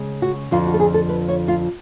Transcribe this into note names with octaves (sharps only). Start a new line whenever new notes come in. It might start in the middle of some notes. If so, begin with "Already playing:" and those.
Already playing: C#3 G#3
F#4
F2 D3 F3 F4
F#4
A4
G#4
A4
B4
C#5
F4